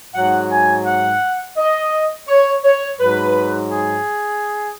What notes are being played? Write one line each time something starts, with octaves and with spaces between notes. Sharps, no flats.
G#2 F#3 F#5
G#5
F#5
D#5
C#5
C#5
G#2 F#3 B4
G#4